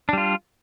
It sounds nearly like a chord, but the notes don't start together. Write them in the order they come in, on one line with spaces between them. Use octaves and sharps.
D4 G3 F4